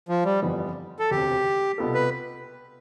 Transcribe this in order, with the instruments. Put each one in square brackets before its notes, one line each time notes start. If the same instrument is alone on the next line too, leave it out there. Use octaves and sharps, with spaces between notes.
[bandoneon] F3
G3
[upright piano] G1 F2 E3 G3 B3
[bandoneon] A4
[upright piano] E1 D2 C3 [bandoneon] G4
[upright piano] C2 B2 B3 F4 A4
[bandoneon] B4